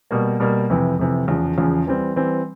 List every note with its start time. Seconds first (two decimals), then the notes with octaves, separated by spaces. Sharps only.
0.11 B2 G3 A#3
0.40 B2 G3 A#3
0.70 F2 C3 E3
0.99 F2 C3 E3
1.28 E2 C#3 F3
1.58 E2 C#3 F3
1.87 E3 G3 C4
2.16 E3 G3 C4